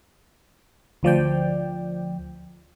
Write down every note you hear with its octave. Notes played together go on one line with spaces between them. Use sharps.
D2 F3 D5 G5